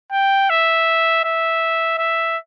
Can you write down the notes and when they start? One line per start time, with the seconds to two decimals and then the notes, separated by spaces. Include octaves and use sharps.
0.12 G5
0.50 E5
1.25 E5
1.98 E5